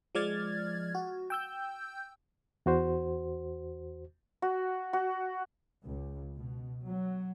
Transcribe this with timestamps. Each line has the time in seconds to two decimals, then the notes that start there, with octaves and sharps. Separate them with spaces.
0.15 F3 G#3 D5 F6 G#6 A6
0.95 F#4
1.30 G5 E6 G6
2.66 E2 F#4 C5
4.42 F#4
4.93 F#4
5.87 C#2
6.37 B2
6.85 F#3